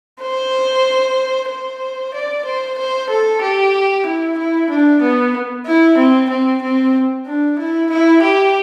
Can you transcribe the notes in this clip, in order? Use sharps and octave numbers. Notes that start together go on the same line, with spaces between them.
C5
C5
D5
C5
C5
A4
G4
E4
E4
D4
B3
E4
C4
C4
C4
D4
E4
E4
G4